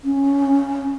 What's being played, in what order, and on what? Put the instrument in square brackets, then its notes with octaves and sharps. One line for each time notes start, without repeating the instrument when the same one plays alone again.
[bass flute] C#4